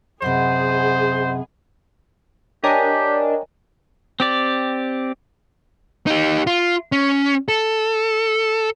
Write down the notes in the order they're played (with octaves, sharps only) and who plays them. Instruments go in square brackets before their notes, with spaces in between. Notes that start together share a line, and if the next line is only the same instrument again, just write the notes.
[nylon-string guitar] F#2 C3 [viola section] G#4 [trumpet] C5 [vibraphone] D#5 F#5 B5
[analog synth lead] D4 [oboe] G4 [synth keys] A#4 D#5 G#5 [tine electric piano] C#5 G5 A#5
[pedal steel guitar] C4 G4 D5
[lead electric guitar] D#4 G4
F4
C#4
A4